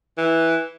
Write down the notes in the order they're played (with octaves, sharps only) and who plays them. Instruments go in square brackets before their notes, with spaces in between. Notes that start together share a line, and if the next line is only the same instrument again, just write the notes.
[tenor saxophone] E3